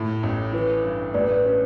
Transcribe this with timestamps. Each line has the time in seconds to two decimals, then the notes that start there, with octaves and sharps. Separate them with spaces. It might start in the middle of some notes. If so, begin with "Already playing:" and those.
Already playing: A2 A4
0.23 A1
0.53 E3 B4
0.83 G2
1.14 A1 B4 D5
1.29 B4 D5
1.44 C#4 B4